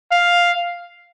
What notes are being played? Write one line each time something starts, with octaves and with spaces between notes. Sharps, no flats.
F5